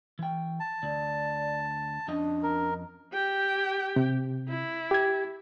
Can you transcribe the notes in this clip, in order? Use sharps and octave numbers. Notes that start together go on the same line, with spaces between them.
E3 G5
A5
D2 D5
F2 C#4 D4 D#5
A#4
G4 G5
C3
E4
G4 G#6